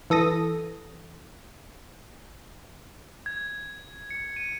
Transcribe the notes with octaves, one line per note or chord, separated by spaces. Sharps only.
E3 A4 D#6 A#6
G#6
C#7
D#7